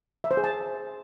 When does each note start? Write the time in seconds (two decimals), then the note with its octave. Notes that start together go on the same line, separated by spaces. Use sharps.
0.24 E5
0.31 C5
0.37 G#4
0.44 A5